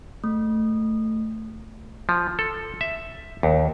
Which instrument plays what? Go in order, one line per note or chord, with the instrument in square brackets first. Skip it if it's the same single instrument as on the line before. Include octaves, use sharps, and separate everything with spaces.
[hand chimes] A3
[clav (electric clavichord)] F3
A4
E5
D#2